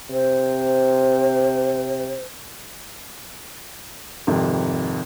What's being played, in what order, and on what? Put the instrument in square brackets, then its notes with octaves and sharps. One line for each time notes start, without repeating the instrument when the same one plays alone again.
[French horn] C3 [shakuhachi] C5
[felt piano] G#1 F2 C3